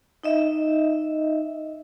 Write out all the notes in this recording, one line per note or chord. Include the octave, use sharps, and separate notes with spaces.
D#4 D#5 E5